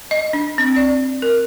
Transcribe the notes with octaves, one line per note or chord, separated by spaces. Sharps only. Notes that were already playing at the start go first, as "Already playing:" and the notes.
D#5
D4
C4
D5
A#4